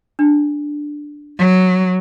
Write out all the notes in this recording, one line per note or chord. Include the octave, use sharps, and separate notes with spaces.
D4
F#3